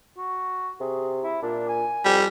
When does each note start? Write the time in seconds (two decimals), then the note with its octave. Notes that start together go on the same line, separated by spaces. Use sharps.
0.18 F#4
0.80 C3 G#4
1.24 E4
1.42 A#2 D4
1.68 G#5
2.05 F2 G3